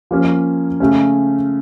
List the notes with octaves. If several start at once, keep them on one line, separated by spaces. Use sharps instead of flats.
F3 A#3 C#4
C#3 A3 C#4